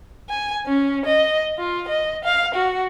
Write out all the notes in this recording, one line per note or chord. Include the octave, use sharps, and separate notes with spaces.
G#5
C#4
D#5
F4
D#5
F5
F#4